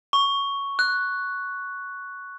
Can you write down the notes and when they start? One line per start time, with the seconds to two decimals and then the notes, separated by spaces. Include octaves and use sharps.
0.13 C#6
0.79 F#6